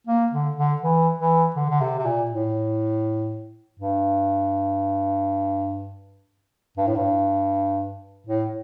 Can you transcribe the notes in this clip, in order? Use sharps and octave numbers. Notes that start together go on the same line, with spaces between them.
A#3
D3
D3
E3
E3
D3
D3
C3
C3
A#2
A2
G2
G2
A2
G2
A2